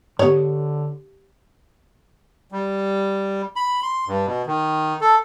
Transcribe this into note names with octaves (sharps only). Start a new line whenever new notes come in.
G#2 D3 B3 G4 C#5
G3
B5
C6
G2
B2
D#3
A4